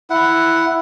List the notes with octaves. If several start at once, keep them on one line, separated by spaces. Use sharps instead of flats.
E4 F#5